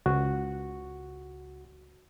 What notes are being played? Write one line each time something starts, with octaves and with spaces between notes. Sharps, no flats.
C#2 F#4